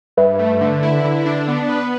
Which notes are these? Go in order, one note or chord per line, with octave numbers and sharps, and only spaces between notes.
G2 B4 E5
A3
D3
E4
D3
D4
B3
B4